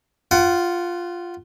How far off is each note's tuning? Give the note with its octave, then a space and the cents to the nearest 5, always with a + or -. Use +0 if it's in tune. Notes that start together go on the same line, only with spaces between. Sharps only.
F4 +0 F#5 +25